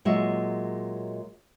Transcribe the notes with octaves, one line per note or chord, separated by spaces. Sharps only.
A#2 F#3 G#3 E5